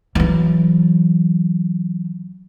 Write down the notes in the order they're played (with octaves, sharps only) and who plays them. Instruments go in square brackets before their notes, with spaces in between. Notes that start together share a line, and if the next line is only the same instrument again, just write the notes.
[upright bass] E3 F#3